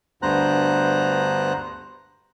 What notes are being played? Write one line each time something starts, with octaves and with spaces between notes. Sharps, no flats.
D2 G2 B3 C5 A#5 F#6